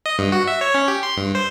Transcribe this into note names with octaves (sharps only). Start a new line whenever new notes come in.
D#5
G2
F#4
E5
C#5
C#4
G4
C6
G2
C5